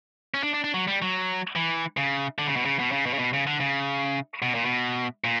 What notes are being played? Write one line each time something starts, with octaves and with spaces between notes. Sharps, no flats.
C#4
D4
D4
D4
F#3
G3
F#3
E3
C#3
D3
C#3
B2
C#3
B2
C#3
B2
C#3
B2
C#3
D3
C#3
B2
A#2
B2
A#2